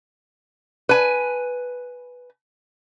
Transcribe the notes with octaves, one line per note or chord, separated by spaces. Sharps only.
B4 G#5